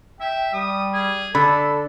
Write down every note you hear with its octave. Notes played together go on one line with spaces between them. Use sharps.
E5 G5
G3 D#6
G#4
D3 A4 A5 B5